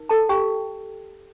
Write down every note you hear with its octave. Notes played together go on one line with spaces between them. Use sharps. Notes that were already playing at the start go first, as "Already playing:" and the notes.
Already playing: D#4 A#4
A4 A5
G4 G5